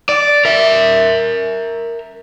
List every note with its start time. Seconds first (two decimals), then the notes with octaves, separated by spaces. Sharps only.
0.09 D5
0.45 A#4 E5